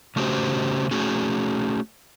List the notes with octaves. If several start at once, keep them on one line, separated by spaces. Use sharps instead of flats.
C#3 A3 C#4 F#4 G4 C5
A3 C#4 F#4 G#4